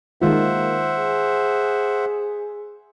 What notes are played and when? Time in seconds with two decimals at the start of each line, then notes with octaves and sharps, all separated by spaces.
0.22 D#3 G#3 A#3 F4 C5 E5 F#5
0.97 G#4